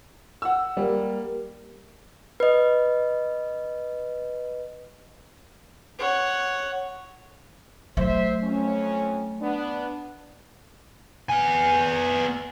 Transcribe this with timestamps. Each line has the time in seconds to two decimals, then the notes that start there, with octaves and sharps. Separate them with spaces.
0.42 F#5 E6
0.77 G3 A#3
2.40 B4 D#5
5.99 C#5 F#5
7.97 F#3 A3 C5 E5
8.43 F2 C#4
9.41 B3 D4
11.29 B3 G#5